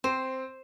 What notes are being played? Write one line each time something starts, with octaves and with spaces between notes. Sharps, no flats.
C4 C5